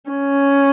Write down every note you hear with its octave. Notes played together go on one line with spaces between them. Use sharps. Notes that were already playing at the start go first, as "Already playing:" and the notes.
C#4